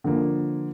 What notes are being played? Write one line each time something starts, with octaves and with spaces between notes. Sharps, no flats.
D3 F3 A#3